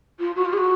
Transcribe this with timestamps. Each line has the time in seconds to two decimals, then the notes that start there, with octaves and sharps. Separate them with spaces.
0.19 F4
0.36 F#4
0.45 F4
0.53 G#4
0.58 F#4